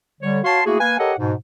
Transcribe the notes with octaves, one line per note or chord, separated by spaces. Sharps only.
D3 G3 C#5
F#4 C#5 F5 A5 C6
A3 A#3 E4 F#4 G#4
A#3 B4 F5 G#5
G4 A4 A#4 C#5 D#5 F#5
G#2 B2